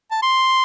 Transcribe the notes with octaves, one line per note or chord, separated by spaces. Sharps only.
A5
C6